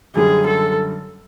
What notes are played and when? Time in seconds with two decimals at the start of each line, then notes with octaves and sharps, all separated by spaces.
0.15 F#2 D3 G3 G#4
0.47 A4